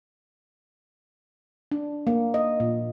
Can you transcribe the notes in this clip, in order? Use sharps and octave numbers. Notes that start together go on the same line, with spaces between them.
D4
A#3
D#5
A#2